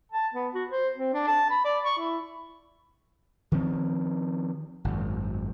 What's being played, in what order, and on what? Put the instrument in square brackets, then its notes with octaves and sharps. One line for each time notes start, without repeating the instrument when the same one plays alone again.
[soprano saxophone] A5
B3
F#4
C5
C4
D4
A5
B5
D5
C#6
E4
[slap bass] D#3 F3 C4
G#1 F#2